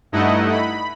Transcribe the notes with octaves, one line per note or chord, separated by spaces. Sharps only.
G2 A3 D#4 E4 D#5 F#5
B5